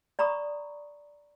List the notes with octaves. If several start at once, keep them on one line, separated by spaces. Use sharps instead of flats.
D5 A#5 B5 C#6 D#6